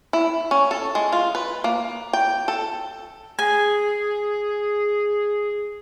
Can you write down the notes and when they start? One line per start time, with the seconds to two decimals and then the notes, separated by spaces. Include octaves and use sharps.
0.13 E4
0.51 C#4
0.71 A4
0.95 G#3
1.13 F4
1.35 B4
1.64 A#3
2.13 G5
2.48 A4
3.39 G#4 G#5